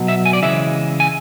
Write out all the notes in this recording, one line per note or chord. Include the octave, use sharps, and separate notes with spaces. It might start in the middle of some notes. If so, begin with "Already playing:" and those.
Already playing: B2 F#3
E5
G#5
D5
C#3 E3 G#3 E5
G#5